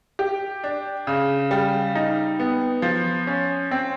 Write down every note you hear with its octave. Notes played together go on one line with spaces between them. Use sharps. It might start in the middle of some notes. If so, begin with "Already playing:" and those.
G4
D4
C#3
G3
D#4
B3
F3
C#4
C4